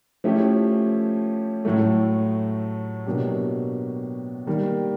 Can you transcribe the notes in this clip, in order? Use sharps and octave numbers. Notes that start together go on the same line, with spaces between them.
F3 A3 C#4 E4 G4
A2 F#3 A3
B2 F#3 A#3 D4 G4
D#3 G3 A#3